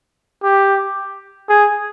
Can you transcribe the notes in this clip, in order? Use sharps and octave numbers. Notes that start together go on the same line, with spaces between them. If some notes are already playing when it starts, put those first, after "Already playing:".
G4
G#4